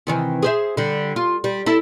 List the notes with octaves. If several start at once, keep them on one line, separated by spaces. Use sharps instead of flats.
C3 D#3 E3
G#4 C5 E5
D3 G3
F4
G3
E4 A4